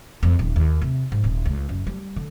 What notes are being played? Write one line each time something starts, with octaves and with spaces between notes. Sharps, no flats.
F2
D#1
D#2
C3
G#2
D#1
C#2
F#1
G3
D3